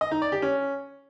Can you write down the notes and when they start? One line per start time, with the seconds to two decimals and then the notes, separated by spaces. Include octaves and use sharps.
0.01 D#5
0.11 D#4
0.22 D5
0.32 G4
0.42 C#4